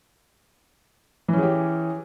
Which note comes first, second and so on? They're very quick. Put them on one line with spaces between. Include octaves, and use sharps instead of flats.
E3 C#4 G#4 G4